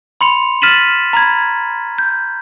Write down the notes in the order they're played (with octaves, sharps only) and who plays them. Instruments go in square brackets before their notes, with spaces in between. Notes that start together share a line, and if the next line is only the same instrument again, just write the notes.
[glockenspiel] B5 C6 C#7 F7
F6 A6 B6 D#7 E7 F#7
A#5 B5 G#6
G6